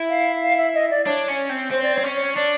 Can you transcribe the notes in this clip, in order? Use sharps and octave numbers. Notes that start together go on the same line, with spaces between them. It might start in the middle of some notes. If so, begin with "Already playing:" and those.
Already playing: E4
F5
F5
E5
D#5
D5
D4 C#5
C#4
C4
C4 C5
D5
C4 C#5
C#4
C#5
D4 D5